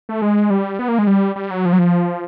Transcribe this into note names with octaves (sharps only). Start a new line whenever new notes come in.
A3
G#3
G3
B3
A#3
G#3
G3
G3
F#3
F3
F#3
F3